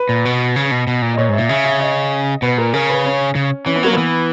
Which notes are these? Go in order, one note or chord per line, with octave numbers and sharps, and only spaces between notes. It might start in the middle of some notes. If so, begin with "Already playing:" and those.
Already playing: B4
A#2
B2
C#3
B2
B2
A#2
D#5
A#2 C#5
G#2 E5
A#2
C#3 E5
E5
D#5
B2 B4
A#2 A#4
C#3 A#4
B4
C#4
C#3
E3 C#4
B3
F#3 A#3
E3 B3